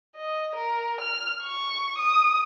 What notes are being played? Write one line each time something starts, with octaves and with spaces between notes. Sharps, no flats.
D#5
A#4
F6
C#6
D#6